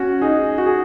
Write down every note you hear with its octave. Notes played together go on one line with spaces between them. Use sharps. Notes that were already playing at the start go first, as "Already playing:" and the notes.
Already playing: C#4 F#4
D#4 G#4
F#4
G#4